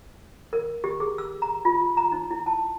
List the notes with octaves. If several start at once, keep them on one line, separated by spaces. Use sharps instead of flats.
A#4
G4
G#4
E6
A#5
F4
A#5
D#4
E4
A5